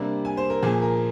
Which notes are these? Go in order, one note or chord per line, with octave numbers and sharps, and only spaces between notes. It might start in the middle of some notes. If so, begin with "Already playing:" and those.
Already playing: C3 G3 A#3 D4
G#5
C5
A#4
A#2 F3 A#3 G#4
A#4